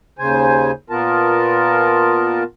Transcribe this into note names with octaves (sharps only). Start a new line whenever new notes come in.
D#2 C#3 C5 G#5
A#2 B3 F4 A#4 A5